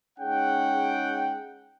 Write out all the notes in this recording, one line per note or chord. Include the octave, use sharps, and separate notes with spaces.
G#3 C#4 D#4 G#4 F#5 G5